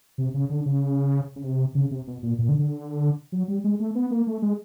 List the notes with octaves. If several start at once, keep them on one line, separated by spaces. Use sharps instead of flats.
C3
C#3
D3
C#3
C#3
C3
C#3
C3
B2
A#2
A#2
D3
D3
F#3
G3
G#3
A3
B3
A#3
A3
G#3